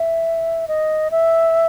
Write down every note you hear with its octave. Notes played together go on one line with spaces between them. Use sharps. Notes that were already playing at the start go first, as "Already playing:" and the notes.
Already playing: E5
D#5
E5